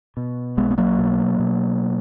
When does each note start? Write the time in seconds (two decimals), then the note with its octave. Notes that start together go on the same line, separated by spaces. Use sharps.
0.17 B2
0.57 B1 G#3 B3
0.71 B3
0.78 F#3 A#3
0.98 B2
1.39 B2